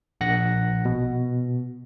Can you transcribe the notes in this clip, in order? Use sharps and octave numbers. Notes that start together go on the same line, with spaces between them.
A#1 F#5 F#6 A#6
B2